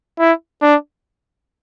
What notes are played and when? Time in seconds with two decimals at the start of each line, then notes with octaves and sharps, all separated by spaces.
0.20 E4
0.62 D4